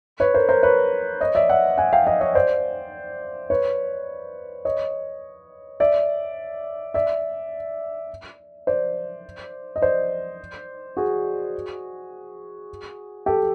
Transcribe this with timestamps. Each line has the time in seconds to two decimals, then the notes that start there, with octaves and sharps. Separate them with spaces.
0.20 B4 C#5
0.34 A#4 C5
0.49 A#4 C5
0.63 B4 C#5
1.21 C#5 D#5
1.35 D5 E5
1.49 E5 F#5
1.78 F#5 G#5
1.92 F5 G5
2.07 D#5 F5
2.21 C#5 D#5
2.35 C5 D5
3.50 B4 C#5
4.65 C#5 D#5
5.80 D5 E5
6.94 D5 E5
8.67 C5 D5
9.76 D#5
9.82 C5 D5
10.97 F#4 G#4
13.26 G4 A4